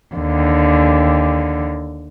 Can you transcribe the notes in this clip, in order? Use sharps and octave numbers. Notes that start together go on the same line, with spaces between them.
D#2 D3